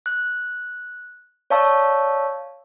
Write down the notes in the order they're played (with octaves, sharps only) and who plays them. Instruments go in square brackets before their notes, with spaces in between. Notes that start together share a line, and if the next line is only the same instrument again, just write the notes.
[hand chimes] F#6
C#5 D5 F5 A5 C#6 E6